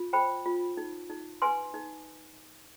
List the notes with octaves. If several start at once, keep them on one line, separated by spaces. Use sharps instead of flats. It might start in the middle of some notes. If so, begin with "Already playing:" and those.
Already playing: F4
C5 G5 B5
F4
D#4
D#4
B4 G#5 C6
D#4